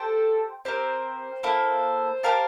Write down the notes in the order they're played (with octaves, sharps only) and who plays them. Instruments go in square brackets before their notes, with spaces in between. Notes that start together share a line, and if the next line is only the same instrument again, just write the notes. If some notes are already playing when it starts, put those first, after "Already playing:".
Already playing: [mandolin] G4 C5 G5 [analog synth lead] A4
[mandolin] C4 G4 A#4 [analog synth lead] C5
[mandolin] A#3 E4 A4
G4 A#4 F5 A5